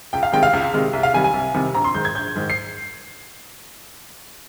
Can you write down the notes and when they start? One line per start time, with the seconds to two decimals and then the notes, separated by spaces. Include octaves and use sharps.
0.13 C#2 G5
0.23 F5
0.32 C3 D#3 G#3 G5
0.43 F5
0.53 C#2
0.74 C3 D#3 G#3
0.93 C2
1.03 F5
1.13 C3 D#3 G3 G#5
1.24 G#5
1.34 C2
1.54 C3 D#3 G3
1.74 A#1 A#5
1.84 C6
1.94 G#2 D#3 G#3 G6
2.05 G#6
2.15 A#1 G6
2.36 G#2 D#3 G#3
2.50 C7